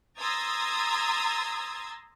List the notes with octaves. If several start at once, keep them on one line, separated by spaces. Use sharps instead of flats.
A#5 C6 D#6 E6 G#6 A6